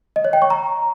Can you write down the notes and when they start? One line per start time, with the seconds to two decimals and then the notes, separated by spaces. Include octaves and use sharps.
0.16 D#5
0.25 C#5
0.33 G5
0.42 C#6
0.50 A#5